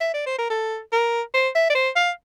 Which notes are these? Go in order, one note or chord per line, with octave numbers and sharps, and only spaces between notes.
E5
D5
C5
A#4
A4
A#4
C5
E5
D5
C5
F5